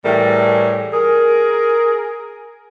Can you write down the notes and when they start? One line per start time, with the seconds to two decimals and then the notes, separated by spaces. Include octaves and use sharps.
0.05 A2 E3 G3 A3 G#4 A#4
0.94 G#4 A#4